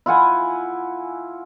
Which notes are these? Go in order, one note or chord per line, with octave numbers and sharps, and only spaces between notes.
E4 F4 F#5 G#5